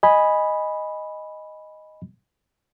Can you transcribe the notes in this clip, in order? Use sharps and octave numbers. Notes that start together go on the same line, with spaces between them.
D#5 G#5 B5